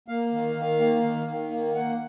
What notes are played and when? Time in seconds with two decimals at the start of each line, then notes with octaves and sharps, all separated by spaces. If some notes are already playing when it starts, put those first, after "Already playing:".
0.08 A#3 F5
0.32 D#3
0.56 D#3
0.80 A#3
1.03 D#3
1.27 D#3
1.51 A#3
1.75 A#3 F#5